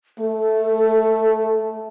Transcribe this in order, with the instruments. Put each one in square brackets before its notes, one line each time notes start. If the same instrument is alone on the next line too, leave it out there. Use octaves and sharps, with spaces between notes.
[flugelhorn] A3 [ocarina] A4